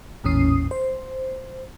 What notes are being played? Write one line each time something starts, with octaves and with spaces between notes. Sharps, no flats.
A1 E2 A#2 C#4 D#6 C7
C5